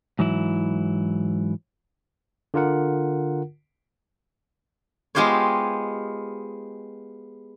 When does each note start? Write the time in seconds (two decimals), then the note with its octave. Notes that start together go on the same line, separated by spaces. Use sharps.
0.19 G#2 E3 F#3 E4
2.54 D3 F4 A#4 F#5
5.15 G#3 B3 F4 G4 C5 C#5